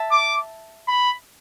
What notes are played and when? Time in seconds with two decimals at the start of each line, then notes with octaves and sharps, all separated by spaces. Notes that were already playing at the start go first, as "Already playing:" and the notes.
Already playing: E5 A5
0.12 D6
0.88 B5